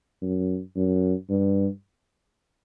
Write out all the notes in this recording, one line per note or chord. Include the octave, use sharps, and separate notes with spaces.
F#2
F#2
G2